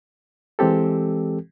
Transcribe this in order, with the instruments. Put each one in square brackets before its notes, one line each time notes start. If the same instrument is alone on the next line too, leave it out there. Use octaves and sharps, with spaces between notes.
[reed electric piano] E3 G#3 C4 G4 A4